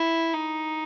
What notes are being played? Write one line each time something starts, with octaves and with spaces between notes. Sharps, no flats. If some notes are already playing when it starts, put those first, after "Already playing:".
Already playing: E4
D#4